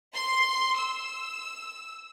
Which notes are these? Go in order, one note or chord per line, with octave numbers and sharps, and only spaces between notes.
C6
E6